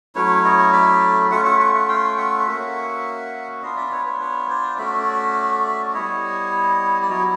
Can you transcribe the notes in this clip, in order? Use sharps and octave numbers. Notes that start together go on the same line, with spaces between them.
F#3 A3 C#4 E4 B4 C#5
C#5 D#5
D5 E5
A3 C#4 F4 E5 F#5
E5 F#5
E5 F#5
E5 F#5
F5 G5
E5 F#5
A#3 C#4 F#4
B3 D4 F4 D#5 F5
D5 E5
D5
B4 C#5
B4 C#5
B4 C#5
C5 D5
A3 C#4 F#4 D5 E5
G3 B3 E4 C#5 D#5
D5
F#3 B3 E4 C#5 D#5